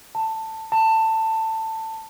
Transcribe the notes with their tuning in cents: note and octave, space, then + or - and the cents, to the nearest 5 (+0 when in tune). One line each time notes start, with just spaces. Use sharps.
A5 +10
A5 +15